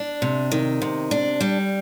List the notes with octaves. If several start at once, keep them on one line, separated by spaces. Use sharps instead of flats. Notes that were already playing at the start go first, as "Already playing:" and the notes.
Already playing: D4
C3
D#3
C3
D4
G3